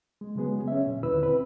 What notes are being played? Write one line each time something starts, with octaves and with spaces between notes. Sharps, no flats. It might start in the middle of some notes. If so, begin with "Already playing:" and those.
G#3
C#3 F#3 G#3 B3 G#4
C#4 E5
A#2
D#2 D3 E4 B4 E6
C4 B4